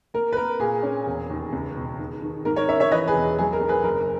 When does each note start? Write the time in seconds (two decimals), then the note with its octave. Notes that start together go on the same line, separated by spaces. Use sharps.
0.14 A#3 A#4
0.32 B4
0.37 A#3 A#4
0.60 A#2 G#4
0.83 C#4
1.06 E1
1.30 D#2
1.52 C#2
1.76 B2
1.99 D#3
2.22 D#3
2.45 G#2 A#4
2.56 A#4 C#5
2.68 C#4 C#5 E5
2.80 C#5 E5
2.92 E3 B4 D#5
3.07 G#4 B4
3.14 E1
3.39 F#3 G#4
3.53 A#4
3.61 B1
3.69 G#4 B4
3.84 F#1 A#4